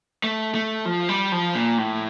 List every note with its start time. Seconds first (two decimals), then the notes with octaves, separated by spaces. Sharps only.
0.24 A3
0.54 A3
0.86 F3
1.09 G3
1.32 F3
1.55 A#2
1.78 A2